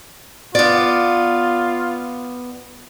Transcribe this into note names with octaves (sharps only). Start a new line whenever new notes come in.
B3 F4 D5